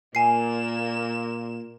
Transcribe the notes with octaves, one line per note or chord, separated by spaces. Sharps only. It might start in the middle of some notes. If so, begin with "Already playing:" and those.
A#2 A#3 G#5 C7 E7